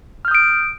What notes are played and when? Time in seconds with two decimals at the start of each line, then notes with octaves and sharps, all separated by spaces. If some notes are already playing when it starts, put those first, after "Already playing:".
0.25 F6
0.28 G6
0.31 D#6
0.35 D7